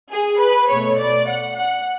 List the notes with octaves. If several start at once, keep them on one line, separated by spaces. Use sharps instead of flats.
G#4
B4
B2 A3 C#5
D5
F#5
F#5